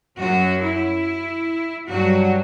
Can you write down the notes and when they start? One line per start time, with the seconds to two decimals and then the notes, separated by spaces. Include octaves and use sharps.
0.19 F#2 F#3 F#4
0.62 E4
1.88 G2 F#3 F#4